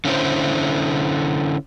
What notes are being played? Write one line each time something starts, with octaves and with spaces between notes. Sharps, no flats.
D3 C#4 E4 C5